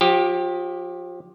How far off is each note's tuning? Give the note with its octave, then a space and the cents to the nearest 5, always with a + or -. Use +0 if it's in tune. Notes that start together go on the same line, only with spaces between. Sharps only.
F3 +30 G4 +0